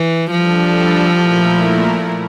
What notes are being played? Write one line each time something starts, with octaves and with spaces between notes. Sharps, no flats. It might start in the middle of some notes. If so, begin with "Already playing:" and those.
Already playing: E3
F3 G3 D4 A4
A#2 A3 E4 A#4